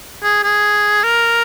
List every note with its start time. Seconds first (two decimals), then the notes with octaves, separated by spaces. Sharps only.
0.23 G#4
0.44 G#4
1.04 A#4